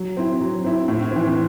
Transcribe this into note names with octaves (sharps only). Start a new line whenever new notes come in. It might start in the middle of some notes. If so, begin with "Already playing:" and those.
Already playing: F#3
C4 E4
F#3
C4 E4
A2
E3 C4